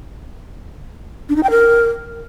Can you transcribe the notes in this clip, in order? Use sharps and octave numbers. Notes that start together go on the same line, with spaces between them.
D4
D#4
G5
A#4